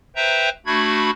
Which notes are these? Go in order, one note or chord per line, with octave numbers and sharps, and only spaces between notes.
B4 C5 E5 G5 A#5
A3 D4 F#4 B5 G#6